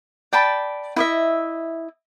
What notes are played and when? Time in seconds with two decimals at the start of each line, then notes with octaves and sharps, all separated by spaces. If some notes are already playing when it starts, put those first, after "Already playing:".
0.33 D5 G5 A5 B5
0.96 E4 D#5 E5